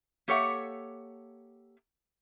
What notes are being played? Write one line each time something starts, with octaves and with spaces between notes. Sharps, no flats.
A#3 G4 A4 C#5 E5 F#5